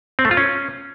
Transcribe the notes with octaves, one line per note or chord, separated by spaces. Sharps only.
C4
A3
F4
C#4